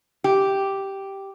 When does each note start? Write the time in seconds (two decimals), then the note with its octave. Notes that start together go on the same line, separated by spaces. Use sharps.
0.24 G4